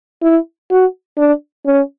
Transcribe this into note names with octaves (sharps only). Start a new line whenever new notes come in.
E4
F#4
D4
C#4